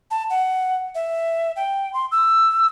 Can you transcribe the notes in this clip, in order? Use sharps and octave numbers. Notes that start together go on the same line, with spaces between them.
A5
F#5
E5
G5
C6
E6